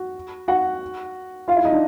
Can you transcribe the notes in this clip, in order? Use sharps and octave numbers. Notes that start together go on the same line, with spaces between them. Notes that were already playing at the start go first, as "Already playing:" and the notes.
Already playing: F#4
F#4 F#5
F4 F5
E4 E5
D#4 D#5
D4